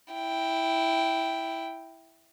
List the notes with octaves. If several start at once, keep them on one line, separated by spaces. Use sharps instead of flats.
E4 G5